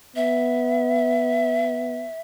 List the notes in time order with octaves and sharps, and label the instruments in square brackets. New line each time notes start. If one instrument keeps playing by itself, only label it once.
[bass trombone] B3 [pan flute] E5